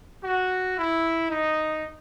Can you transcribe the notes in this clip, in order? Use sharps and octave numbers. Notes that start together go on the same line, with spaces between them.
F#4
E4
D#4